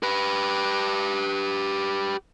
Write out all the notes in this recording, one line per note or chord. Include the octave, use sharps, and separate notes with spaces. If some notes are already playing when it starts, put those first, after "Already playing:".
G4 B4